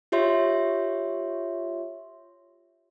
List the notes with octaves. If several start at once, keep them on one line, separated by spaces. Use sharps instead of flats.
F4 G4 C#5 E5 C6